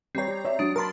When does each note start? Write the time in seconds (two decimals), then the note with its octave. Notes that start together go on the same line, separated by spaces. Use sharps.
0.15 G3 C4 C#5 A#5
0.28 G4
0.45 C#5 D5 E5
0.59 F#3 D4 D#6
0.76 A#4 A5 B5 C6 A6